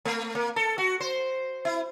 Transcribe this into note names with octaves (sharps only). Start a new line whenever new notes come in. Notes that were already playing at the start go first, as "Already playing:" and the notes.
A3
A#3
A4
F#4
C5
E4